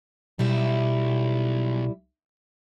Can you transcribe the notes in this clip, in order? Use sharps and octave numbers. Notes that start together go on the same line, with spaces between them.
B1 G3 E4